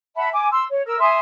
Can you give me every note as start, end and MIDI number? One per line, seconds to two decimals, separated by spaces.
0.16 0.28 76
0.16 0.28 78
0.16 0.28 81
0.16 0.28 83
0.32 0.50 80
0.32 0.50 86
0.51 0.65 84
0.51 0.65 88
0.70 0.84 73
0.85 0.99 70
0.85 0.99 88
1.00 1.20 76
1.00 1.20 80
1.00 1.20 84
1.00 1.20 87